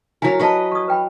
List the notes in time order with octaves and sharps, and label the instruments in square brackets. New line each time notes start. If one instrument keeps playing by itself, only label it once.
[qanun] F#3 A#4 [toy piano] E4 F5 G#5
[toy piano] G4 F5 A5 [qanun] B4 D#5
[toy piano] C#6 D#6
B4 G5 B5